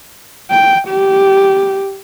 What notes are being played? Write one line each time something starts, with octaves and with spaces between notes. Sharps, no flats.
G5
G4